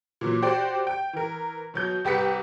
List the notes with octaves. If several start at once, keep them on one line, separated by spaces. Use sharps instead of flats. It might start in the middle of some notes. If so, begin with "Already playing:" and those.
A#2 E3 F#3
F#4 G4 C5 D5 G5
G5
E3 A#4
B2 F#3 G6
C2 G4 B4 B6 C#7